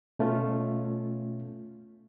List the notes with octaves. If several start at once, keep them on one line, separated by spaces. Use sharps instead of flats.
B2 A3 C#4 F4